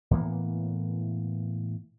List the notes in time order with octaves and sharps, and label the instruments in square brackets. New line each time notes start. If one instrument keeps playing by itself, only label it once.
[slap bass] A2 E3 A#3 B3